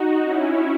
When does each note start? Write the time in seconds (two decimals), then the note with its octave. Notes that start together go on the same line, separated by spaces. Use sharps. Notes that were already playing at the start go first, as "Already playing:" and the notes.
Already playing: D#4 F#4
0.23 C#4 E4